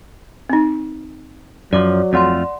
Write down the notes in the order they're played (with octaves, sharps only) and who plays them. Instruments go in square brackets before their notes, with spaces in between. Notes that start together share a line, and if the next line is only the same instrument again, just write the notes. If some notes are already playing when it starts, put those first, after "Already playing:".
[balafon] C4 D#4
[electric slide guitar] F#2 F3 [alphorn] F#3 [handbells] D5 D6
[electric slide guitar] F2 A3 F4 [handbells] D5 F#5 C6